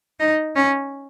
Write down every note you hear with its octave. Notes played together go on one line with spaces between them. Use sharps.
D#4
C#4